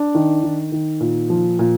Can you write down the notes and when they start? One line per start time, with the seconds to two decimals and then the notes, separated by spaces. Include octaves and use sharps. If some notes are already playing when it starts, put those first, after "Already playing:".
Already playing: D4
0.15 D#3
0.43 D#3
0.72 D#3
1.00 A#2
1.30 F3
1.59 A#2